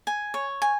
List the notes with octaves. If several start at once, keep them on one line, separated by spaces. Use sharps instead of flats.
G#5
C#5
G#5